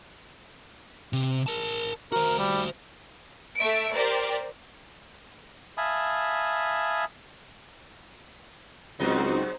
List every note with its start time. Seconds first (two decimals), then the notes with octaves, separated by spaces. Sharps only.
1.13 C3
1.47 A#4 A5
2.12 F#4 A#4 C5
2.39 G3
3.56 A3 E5 D7
3.92 G4 A#4 C5 D5
5.77 E5 F5 G#5 A5 B5 D#6
9.00 C#2 G#2 F#3 C4 D#4 F#4 C5 D#5